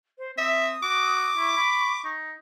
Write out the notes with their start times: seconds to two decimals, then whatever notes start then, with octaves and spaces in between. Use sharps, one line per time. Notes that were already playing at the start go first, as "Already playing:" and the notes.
0.18 C5
0.38 C4 E5 D#6
0.83 F#4 D6
1.37 E4 C#6
1.57 B5
2.05 D#4